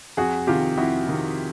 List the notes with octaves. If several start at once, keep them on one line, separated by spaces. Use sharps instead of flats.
F2 F#4 G#4
C3 D#3 F4 G4
F2 E4 F#4
C3 D#3